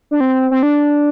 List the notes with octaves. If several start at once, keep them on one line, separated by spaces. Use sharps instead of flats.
D4
C4
C4
D4